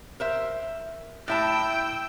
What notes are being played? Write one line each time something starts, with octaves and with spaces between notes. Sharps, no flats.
A#4 C5 E5
A2 E4 G5 A5 E6